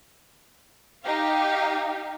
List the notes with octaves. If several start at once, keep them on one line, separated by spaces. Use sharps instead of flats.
D#4 G4 F5